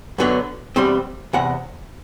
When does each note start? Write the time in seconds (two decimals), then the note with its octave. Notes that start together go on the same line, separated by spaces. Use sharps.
0.18 F#2 D3 F#3 B3
0.76 E2 B2 G3 C4 C6
1.33 E2 C3 F#5